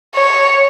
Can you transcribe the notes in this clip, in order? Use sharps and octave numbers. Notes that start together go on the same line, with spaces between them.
C#5